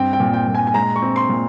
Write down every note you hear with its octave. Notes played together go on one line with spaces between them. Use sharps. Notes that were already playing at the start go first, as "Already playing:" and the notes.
Already playing: G2 C4 G5
G5
A#2
G5
A#2
G#5
G#5
G#3 A#5
C#6
C4
C6
A#2